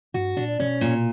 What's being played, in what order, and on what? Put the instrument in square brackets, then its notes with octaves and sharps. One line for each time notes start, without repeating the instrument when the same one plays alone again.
[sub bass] G2 [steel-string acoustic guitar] F#4
[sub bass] A#2 [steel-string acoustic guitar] D4
[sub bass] B2 [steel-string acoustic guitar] C#4
[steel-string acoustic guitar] A#2